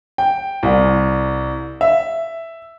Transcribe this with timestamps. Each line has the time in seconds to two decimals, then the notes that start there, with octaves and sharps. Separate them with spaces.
0.18 G5
0.63 C2
1.81 E5